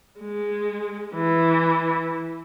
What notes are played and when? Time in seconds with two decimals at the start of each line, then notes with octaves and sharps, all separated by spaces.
0.21 G#3
1.15 E3